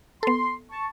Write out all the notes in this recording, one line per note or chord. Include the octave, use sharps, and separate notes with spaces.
B3 A4 C6
A5 C#6